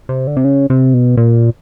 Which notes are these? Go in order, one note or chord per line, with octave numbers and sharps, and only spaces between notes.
C3
D3
C3
C#3
C3
B2
A#2